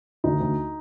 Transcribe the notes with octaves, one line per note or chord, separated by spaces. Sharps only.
D2 D#4
D2